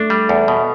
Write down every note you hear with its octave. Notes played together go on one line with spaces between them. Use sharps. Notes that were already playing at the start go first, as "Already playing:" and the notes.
Already playing: A3 D4
G3
E2
B2